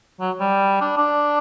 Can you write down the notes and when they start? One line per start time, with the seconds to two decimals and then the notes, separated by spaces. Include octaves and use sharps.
0.20 F#3
0.40 G3
0.81 D4
0.97 D4